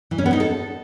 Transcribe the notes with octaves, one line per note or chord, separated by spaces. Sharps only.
E3
C#4
B3
D#4
A4